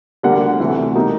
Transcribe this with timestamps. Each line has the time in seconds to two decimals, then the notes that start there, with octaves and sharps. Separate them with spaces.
0.23 D2 D3 G3 A#3 F#5
0.41 F#5
0.60 D2 C3 E3 A3
0.95 B2 G3 A#3 D#4